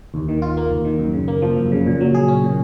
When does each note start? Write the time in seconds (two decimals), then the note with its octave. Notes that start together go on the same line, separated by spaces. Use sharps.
0.14 D#2
0.28 D#3
0.42 F4
0.57 A#3
0.71 D#2
0.85 D#3
0.99 F#2
1.13 C#3
1.28 A#3
1.42 F3
1.57 F#2
1.72 C#3
1.86 A#2
2.00 F#3
2.14 G#4
2.28 C#4
2.44 A#2